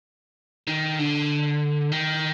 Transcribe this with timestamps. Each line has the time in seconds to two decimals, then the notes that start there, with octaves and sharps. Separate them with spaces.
0.67 D#3
0.99 D3
1.92 D#3